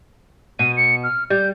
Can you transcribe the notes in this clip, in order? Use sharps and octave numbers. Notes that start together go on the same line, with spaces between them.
B2 D#7
C#7
F6
G3 G6